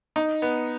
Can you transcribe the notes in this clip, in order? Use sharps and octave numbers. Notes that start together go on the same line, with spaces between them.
D#4
B3